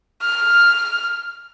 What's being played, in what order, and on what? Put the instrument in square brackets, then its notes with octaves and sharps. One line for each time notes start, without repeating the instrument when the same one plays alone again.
[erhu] F6